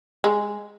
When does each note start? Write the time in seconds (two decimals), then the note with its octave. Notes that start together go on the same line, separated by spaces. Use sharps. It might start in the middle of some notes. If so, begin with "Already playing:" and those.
0.24 G#3